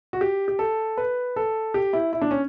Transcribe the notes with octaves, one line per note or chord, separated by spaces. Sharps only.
F#4
G4
G4
A4
B4
A4
G4
E4
E4
D4
C#4